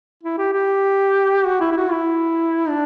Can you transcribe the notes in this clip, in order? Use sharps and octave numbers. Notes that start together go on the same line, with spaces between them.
E4
G4
G4
F#4
E4
E4
F#4
E4
D4